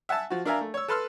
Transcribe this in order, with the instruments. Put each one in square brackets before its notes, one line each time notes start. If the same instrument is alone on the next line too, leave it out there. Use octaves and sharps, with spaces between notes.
[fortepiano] E5 F#5 G#5 A5 E6
F3 F#4
D4 A#4 E5 F5 G#5 A#5
A3
C#5 E6
A4 B4 A5 C6 E6 F6